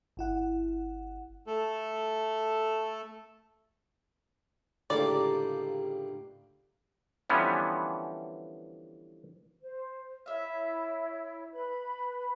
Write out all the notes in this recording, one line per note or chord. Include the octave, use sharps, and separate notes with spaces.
G1 E4 F#5
A3 A4
C#2 A2 D3 G3 A#3 G4 D5
D3 E3 F3 G3 B3 C#4
C5
E4 C#5 E5 F5
B4 B5